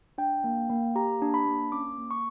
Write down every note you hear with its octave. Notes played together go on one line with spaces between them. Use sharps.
D4 G5
A#3
A#3
G4 A#5
D4
B5
A#3
C#4 D6
A#3
C#6